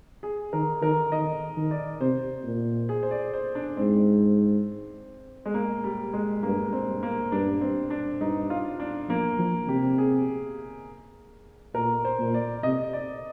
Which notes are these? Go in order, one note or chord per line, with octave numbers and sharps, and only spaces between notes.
G#4
D#3 A#4
D#3 A#4
D#3 D#5
D#3
D5
C3 C5
A#2
G#4
C5
D5
C5
D4
G#2 C4
G#3
A#3
G3
G#3
G2 A#3
C4
G2
A#3
G2 D4
C4
D4
G2 D#4
F4
D4
F3 A#3
F3
C3 G4
G#4
A#2 A#4
C5
A#2
D5
C3 D#5
D5